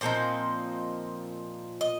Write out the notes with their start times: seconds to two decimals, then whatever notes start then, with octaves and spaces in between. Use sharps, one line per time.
0.01 A#2 F3 C4 D#4 C5
1.81 D#5